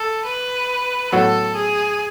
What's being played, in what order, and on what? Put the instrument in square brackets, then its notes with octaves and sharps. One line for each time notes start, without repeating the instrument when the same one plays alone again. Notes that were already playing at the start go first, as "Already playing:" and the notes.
Already playing: [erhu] A4
B4
[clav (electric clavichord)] A2 F#3 B3 F#4 [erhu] A4
[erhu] G#4